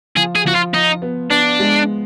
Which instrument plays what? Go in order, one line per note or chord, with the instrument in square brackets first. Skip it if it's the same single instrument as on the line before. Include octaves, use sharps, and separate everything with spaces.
[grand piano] F3 [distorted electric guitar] G#4
[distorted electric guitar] G#4
[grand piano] F3 [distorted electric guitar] F#4
[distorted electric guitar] F4
[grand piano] F3 [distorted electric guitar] D#4
[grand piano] B3
[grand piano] B3 [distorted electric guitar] D4
[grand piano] G#3